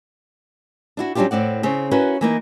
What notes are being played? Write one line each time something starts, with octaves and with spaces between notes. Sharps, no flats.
D4 E4 F#4
F#3 G3 C#4 D4 F4 G4
A2 C4 D5 F#5
C#3 C4 C#5
C#4 E4 F#4 A#4 B4 C#5
E3 A#3 D#4